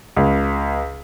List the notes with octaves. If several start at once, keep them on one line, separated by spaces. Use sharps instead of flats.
C#2